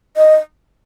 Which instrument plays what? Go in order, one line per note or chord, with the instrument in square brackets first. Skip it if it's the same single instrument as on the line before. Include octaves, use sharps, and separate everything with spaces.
[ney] D#5